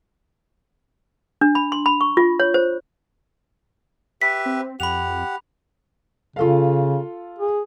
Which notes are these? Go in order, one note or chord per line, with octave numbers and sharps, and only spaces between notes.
D4
B5
C6
B5
C#6
F4
C#5
C5
G4 B4 E5 B6
C4
F2 G4 F#5 B5 F7
C#3 F4 A4 F5
G#4